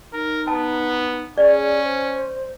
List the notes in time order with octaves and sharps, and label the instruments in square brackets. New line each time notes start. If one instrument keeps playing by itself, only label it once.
[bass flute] D#4 [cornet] A#4
[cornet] B3 [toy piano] A5
[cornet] C#4 [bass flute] G#4 [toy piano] D5
[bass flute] C5